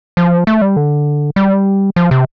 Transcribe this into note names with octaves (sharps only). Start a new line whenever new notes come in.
F3
A3
G3
D3
G3
F3
C3